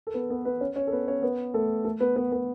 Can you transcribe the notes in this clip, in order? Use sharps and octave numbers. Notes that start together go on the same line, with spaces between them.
A4
B3 B4
B3 B4
B3 B4
C#4 C#5
C#4 C#5
A4
B3 B4
C#4 C#5
B3 B4
A3 A4
A3 A4
B3 B4
B3 B4
B3 B4